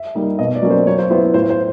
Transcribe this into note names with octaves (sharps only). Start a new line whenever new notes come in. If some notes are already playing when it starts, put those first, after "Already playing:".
Already playing: E5
G3 A#3 D#4
B2 D#5
D5
F#3 A#3 C#4
C5
F#3 C#5
C5
B3 E4 C5
A2 C5
C5